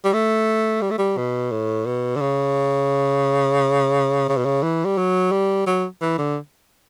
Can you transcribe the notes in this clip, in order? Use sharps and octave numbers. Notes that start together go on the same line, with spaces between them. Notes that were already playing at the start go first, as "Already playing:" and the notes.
G3
A3
G3
A3
G3
B2
A2
B2
D3
C#3
C#3
B2
C#3
E3
G3
F#3
G3
F#3
E3
D3